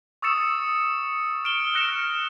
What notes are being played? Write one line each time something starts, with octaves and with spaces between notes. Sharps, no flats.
C#6 D#6 E6 A6 C#7 E7
F6 D7 E7 G7
F6 F#6 A#6 C#7 D7 E7